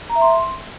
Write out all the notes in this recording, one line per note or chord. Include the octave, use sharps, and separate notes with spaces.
A#5
E5
C6